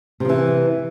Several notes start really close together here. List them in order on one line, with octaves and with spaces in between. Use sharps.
C3 F3 E3